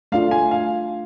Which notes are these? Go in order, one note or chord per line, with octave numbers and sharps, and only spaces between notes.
A3 D4 F4 F5
G#5
F5